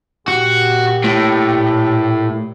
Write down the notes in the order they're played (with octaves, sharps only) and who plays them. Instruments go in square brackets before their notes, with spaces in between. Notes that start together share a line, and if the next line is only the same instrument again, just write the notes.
[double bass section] A#2 [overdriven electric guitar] F#4 [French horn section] G4
[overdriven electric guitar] A2